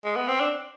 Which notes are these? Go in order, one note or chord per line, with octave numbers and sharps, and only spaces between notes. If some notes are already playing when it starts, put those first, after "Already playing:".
G#3
B3
C4
D4